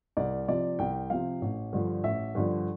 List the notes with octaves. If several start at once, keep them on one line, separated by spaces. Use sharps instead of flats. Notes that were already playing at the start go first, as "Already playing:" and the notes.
C2 D5
C3 F3 D5
C2 G5
C3 F3 F5
A1
G2 D3 F3
A1 E5
G2 D3 F3